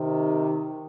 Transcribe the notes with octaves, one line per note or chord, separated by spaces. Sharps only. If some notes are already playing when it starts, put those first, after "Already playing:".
Already playing: C3 D#3